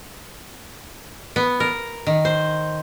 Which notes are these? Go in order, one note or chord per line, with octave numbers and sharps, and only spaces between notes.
B3
A#4
D#3
C5